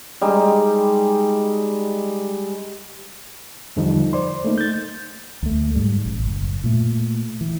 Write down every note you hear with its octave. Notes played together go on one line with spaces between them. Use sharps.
G3 G#3 D#4
E2 D3 F3 G3 D#4
C5 D5 C6
A3 A#3 D#4
G6 A6
D2 A3
G#2 G3
A1
F#1
A#2 A3
E3